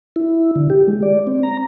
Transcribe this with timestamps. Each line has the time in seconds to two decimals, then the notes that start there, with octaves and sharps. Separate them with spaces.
0.16 E4
0.56 D3
0.70 G4
0.88 G#3
1.02 D5
1.27 C4
1.43 A#5